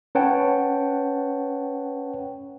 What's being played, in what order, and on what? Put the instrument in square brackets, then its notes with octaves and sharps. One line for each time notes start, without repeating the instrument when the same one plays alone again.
[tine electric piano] C#4 B4 C#5 F#5 G5 A5